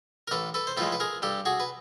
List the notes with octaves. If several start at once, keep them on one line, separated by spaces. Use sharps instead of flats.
A#4
A1 A4 B4
A4 B4
C5
A2 F3 G#3 A4 B4
B4
G#4 A#4
G2 G4 A4
F#4 G#4
B4